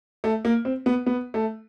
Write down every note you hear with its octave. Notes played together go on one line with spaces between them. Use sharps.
A3
A#3
C4
B3
B3
A3